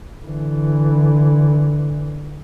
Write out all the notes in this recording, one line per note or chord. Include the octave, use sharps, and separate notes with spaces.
D3 E3